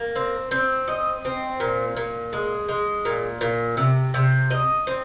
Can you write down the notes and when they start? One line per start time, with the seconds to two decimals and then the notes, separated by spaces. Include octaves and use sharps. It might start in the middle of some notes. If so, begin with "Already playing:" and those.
Already playing: A#3
0.16 C4
0.51 C4
0.88 D#5
1.25 C4
1.60 A#2
1.97 A#2
2.33 G#3
2.68 G#3
3.05 A#2
3.41 A#2
3.77 C3
4.14 C3
4.51 D#5
4.87 C4